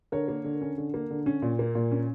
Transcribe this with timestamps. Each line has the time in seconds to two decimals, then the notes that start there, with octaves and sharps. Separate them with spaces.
0.12 D3 A#4 C#5
0.28 A#3
0.44 D3
0.62 C#4
0.78 D3
0.94 A#3
1.10 D3
1.26 C#4
1.42 A#2
1.59 A#3
1.75 A#2
1.92 C#4